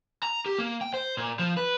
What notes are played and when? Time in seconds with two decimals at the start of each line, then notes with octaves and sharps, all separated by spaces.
0.23 A#5
0.46 G4
0.59 A#3
0.81 G5
0.94 C5
1.17 A#2
1.39 F3
1.57 B4